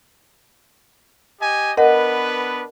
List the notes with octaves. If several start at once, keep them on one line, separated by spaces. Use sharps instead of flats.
G4 D#5 G#5
B3 D4 A#4 B4 D#5 F#5